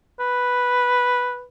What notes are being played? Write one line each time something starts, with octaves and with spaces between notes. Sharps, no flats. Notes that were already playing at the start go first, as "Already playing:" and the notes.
B4